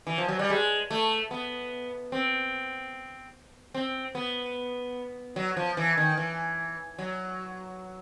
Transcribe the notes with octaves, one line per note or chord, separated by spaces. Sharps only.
E3
F3
F#3
G3
G#3
A3
B3
C4
C4
B3
F#3
F3
E3
D#3
E3
F#3